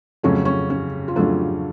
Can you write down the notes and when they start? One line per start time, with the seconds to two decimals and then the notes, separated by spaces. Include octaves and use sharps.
0.23 F2 C#3 F#3 A3 C#4
0.45 C#4
0.70 C#4
1.08 F4
1.16 F2 C#3 F#3 A3 D4